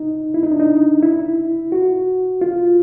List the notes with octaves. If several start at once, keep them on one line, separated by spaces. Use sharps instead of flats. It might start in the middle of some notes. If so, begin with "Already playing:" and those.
Already playing: D#4
E4
D#4
D4
D#4
E4
F#4
F4